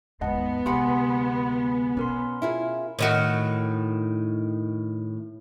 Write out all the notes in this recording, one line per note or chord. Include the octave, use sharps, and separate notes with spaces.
D#2 G#2 B3 D#5 F#5 A5
D2 C3 G#3 G4 F#5 B5 C6
B2 C#4 A#4 C6
E4 F4 G#4
A2 D#3 F#4